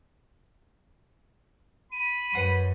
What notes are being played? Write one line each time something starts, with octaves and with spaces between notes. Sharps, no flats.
B5 D#7
F#2 B4 F#5 C6